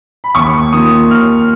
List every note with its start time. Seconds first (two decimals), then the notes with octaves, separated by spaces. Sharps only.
0.24 B5
0.35 D#2 C#6
0.72 D#3 A#3 F4 D#6
1.10 D#2 F6